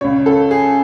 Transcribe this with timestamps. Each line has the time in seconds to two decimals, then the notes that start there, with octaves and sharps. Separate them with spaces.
0.01 C#2 C#3 C#5
0.26 A4
0.51 G#4